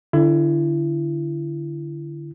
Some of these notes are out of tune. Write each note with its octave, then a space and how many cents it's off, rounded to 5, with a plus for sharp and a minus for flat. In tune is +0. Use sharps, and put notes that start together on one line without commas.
D3 +0 E4 +30